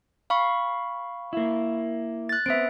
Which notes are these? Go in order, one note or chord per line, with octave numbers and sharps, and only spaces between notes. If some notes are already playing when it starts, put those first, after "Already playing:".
F5 B5 C#6
A#3 E4
F#6 A6
B3 C4 E5 D7